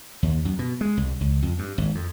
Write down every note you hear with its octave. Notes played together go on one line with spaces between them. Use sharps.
D#2
F#2
B2
G#3
C2
C#2
F2
G2
G#1
F2